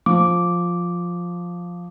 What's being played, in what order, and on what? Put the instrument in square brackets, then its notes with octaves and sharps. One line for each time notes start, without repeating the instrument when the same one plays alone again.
[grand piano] F3 [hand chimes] D6